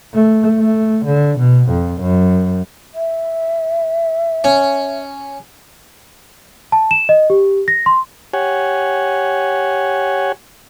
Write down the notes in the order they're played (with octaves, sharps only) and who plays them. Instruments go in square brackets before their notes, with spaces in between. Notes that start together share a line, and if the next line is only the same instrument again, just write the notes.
[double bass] A3
A3
D3
B2
F2
F#2
[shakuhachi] E5
[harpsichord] C#4
[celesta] A5
E7
D#5
G4
A#6
C6
[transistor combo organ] G4 C#5 F#5 G#5